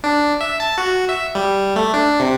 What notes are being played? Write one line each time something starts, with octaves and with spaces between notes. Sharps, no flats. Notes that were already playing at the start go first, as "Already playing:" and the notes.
D4
E5
A5
F#4
E5
G3
A3
D4
C3